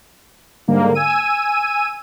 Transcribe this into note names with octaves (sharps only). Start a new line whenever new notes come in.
G#2 D3 G3 A#3
G#5 E6 D#7